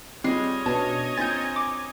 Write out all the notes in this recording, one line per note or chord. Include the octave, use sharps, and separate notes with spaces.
G3 G#3 C4 F4 C#5 D#5 C7
B2 C#4 D4 F5 A5
C4 F4 A#4 G#5 G6 A6
D6